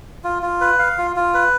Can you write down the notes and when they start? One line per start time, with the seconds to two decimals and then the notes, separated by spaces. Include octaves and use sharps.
0.24 F4
0.43 F4
0.61 B4
0.79 F5
0.98 F4
1.16 F4
1.34 B4